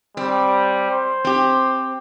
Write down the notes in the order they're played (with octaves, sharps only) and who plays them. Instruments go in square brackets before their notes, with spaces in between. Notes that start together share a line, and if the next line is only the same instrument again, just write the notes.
[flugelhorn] G3 [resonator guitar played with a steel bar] C4
[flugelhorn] C5
[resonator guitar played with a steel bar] C4 G4